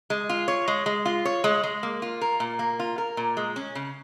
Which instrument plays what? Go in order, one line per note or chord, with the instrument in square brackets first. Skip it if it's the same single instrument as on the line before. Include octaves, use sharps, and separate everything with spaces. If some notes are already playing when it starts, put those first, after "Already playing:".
[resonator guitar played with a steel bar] G#3
F4
C#5
G#3
G#3
F4
C#5
G#3
G#3
A#3
F4
A#4
A#2
A#3
F4
A#4
A#2
G#3
C#4
C#3